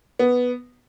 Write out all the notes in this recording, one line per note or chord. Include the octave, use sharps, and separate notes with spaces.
B3